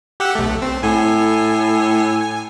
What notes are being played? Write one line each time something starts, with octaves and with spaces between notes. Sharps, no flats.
G4 F#5 E6
B1 A3
C4
A2 G#5